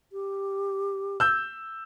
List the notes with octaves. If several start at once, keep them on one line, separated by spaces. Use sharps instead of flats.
G4
E6 G6